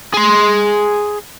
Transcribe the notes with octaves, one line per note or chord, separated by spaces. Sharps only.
G#4 C6